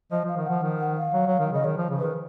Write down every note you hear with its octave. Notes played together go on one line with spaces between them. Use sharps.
F3 D#5
F3 F5
D#3
F3 F#5
D#3
F#5
F5
F#3
F#3
D#3
C#3 D#5
D#3 C#5
F3
C#3
D#3 B4